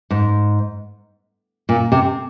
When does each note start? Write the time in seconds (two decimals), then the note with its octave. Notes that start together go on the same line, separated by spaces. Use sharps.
0.10 G#2
1.69 A#2
1.92 C3